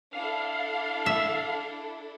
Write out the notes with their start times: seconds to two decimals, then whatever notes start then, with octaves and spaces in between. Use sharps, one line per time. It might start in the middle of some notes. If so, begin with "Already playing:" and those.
0.13 D4 E4 A4 F5
1.06 E5